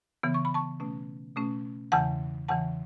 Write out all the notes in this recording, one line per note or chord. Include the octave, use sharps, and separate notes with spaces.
C#3 E3 B3
C#6
B5
A5 C#6
B2 A3 C#4
B2 A3 C#4
E2 C#3 E3 F#5 A5
E2 C#3 E3 F#5 A5